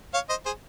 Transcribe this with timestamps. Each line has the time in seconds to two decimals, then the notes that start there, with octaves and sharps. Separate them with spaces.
0.14 C#5 F5
0.29 C5 D#5
0.45 G#4 C5